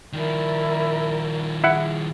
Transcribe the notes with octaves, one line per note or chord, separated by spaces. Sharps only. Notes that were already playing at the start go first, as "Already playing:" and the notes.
D#3 F3 E4 A#4 D5
E4 G#4 F#5